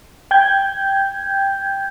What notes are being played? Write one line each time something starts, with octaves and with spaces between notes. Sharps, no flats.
G5 G6 G#6